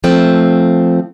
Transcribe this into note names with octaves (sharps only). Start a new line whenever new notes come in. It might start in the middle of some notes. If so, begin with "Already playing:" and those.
F3 A3 C4